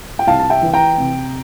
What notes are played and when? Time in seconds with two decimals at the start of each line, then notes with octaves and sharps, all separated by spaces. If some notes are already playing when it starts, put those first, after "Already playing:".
0.19 G5
0.27 C2 F5 A5
0.39 A5
0.50 E5 G5
0.62 E3
0.73 G5 A#5
0.98 C3